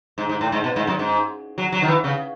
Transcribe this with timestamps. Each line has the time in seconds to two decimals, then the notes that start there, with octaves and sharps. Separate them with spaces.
0.18 G#2
0.29 G#2
0.41 A2
0.52 G#2
0.64 B2
0.76 G#2
0.87 F#2
0.99 G#2
1.58 F#3
1.72 F#3
1.82 D#3
1.88 E3
2.04 C#3